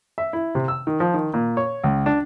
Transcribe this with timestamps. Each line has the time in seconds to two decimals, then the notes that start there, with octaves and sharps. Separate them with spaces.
0.18 E5
0.33 E4
0.55 C3
0.68 E6
0.87 D#3
1.00 F3
1.14 D#3
1.34 A#2
1.57 C#5
1.84 C#2
2.06 D4